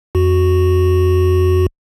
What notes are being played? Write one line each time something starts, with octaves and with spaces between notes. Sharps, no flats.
F2 F#4